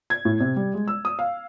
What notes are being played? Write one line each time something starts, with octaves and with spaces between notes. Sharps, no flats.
G#6
A2
C3
G3
G#3
E6
D#6
F5